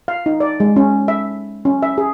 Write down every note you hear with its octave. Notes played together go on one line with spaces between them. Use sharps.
F5
D#4
D5
G#3
C#4
E5
C#4
E5
G#4